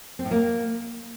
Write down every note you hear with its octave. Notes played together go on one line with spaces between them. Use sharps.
C4
A2
A#3